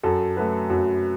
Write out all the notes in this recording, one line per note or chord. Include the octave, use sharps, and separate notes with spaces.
F#2 A4
F#3 A3 B4
F#2